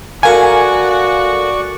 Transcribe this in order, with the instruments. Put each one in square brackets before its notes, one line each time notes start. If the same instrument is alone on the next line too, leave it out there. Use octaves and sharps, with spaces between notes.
[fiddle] F#4 [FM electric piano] A4 A#4 F5 [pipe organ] D5 C#6 [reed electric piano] G#5